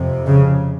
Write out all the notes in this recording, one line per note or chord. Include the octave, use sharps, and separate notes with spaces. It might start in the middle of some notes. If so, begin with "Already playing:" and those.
Already playing: F2 C3
C#3